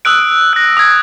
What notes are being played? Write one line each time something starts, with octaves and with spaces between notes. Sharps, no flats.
D#6 E6 F#6 D7
F#6 A#6
D#6 G#6